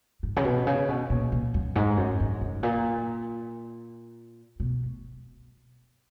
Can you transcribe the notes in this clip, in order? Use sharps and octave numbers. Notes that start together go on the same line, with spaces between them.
G#2
C#3
B2
C#3
B2
A#2
A#2
F#2
G#2
F#2
F#2
G#2
A#2
B2